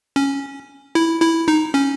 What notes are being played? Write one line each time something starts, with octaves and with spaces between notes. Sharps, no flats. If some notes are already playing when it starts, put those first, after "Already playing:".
C#4
E4
E4
D#4
C#4